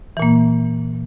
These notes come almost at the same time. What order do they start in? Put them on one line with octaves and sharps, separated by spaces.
E3 A#2 A#3